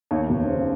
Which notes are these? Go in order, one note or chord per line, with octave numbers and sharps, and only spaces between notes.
D#2 C#5
F1
C#3 C5